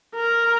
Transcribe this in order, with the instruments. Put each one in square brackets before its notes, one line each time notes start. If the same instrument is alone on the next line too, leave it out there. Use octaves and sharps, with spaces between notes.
[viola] A#4